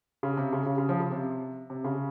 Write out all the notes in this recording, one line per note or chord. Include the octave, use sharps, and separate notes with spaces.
C#3
C3
C#3
C#3
C#3
F3
C#3
C3
C3
C#3